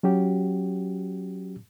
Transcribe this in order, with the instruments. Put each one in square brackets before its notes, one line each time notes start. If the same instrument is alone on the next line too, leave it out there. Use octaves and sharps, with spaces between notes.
[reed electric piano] F#3 C#4 F#4 G4